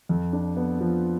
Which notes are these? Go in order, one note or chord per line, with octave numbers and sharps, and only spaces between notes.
F2
D4
B3
F3